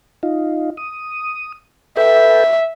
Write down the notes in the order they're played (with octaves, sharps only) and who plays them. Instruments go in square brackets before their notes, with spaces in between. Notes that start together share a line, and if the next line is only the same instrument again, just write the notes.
[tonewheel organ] D#4 F4
D#6
[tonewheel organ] A4 B4 G5 [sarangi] E5